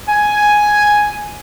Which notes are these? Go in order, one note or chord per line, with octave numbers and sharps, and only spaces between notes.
G#5